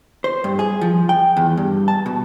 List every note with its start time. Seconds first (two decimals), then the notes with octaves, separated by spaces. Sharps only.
0.24 C5
0.44 G2
0.59 G#4
0.81 F3
1.09 G5
1.37 E2
1.57 G2
1.88 A5
2.06 B2